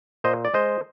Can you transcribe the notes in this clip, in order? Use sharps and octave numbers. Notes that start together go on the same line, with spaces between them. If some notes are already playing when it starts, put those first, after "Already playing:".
A#2 C5 D#5
D5
G#3 C5 D#5